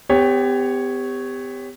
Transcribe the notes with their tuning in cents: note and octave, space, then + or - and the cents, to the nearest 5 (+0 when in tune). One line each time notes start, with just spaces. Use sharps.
B3 +45 G4 +20 C#5 +0